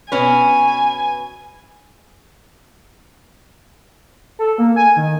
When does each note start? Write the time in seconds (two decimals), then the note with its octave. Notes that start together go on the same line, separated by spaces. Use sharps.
0.12 B2 C#4 B4 G#5
4.39 A4
4.58 A#3
4.76 G#5
4.96 D#3